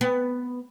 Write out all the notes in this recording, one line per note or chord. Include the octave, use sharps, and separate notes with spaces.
B3